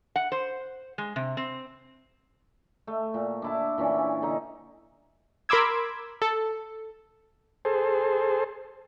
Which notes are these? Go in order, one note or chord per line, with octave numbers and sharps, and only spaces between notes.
F#5
C5
G#3
C3
C4
A3
A#2
D4 E4 A5
A#2 E3 C#4 D4
D3 D#4 A#5
A#4 B5 C6 D6 E6 G#6
A4
G#4 A4 C5